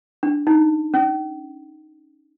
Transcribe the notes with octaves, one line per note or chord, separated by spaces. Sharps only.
D4
D#4
C#4